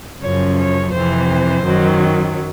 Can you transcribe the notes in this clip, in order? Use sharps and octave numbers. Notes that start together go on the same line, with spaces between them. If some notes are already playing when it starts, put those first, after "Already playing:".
F#2 C#3 F3 C#5
C#5
F2 C3 E3 C5
F#2 D#3 F#3